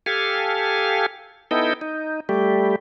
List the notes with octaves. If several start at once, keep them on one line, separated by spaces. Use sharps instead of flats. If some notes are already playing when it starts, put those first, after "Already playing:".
G4 A4 F5 G#5
B3 D#4 E4 A4 D#5 G5
D#4
G3 A3 G4